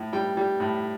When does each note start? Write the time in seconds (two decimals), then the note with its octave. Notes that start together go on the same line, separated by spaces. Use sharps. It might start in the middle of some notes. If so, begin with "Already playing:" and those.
Already playing: A2
0.13 G3 G5
0.37 G3
0.60 A2